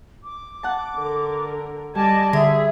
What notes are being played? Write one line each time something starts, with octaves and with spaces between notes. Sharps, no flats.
D6
F#5 A5
D3 A#4
G3 D5 D#5 G#5 A5
D3 G#4 E5